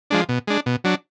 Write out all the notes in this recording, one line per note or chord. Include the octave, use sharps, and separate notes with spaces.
F3 G#3 D4
B2
G#3 D4
B2
F#3 D4